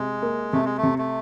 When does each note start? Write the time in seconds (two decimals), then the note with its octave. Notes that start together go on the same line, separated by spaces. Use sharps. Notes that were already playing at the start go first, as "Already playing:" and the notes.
Already playing: C3 G#3
0.23 A#3
0.53 C3 A3
0.65 G#3
0.77 A3
0.83 C3
0.98 A3